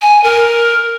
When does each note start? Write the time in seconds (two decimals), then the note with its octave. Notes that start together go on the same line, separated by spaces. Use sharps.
0.02 G#5
0.23 A#4